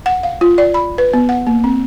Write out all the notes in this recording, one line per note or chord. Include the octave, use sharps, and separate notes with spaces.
F#5
F5
F4
D5
B5
B4
B3
F#5
A#3
C4